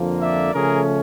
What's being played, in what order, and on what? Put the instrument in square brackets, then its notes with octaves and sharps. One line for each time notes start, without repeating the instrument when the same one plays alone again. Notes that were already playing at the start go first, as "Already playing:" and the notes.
Already playing: [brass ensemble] F2 D3 F3 A#3
D5 E5
C#3 F3 A3 C#4 G#4 A#4